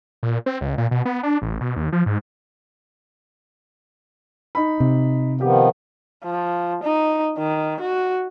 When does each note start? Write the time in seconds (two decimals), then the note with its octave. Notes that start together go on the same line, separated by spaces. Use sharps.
0.23 A#2
0.46 C4
0.61 C#2
0.78 A#2
0.91 B2
1.05 B3
1.23 D4
1.42 A1
1.61 B2
1.76 D#2
1.92 F3
2.06 G#2
4.55 D#4 B5
4.80 C3
5.41 D#3 F3 B3 G4
6.24 F3
6.84 D#4
7.38 D#3
7.81 F#4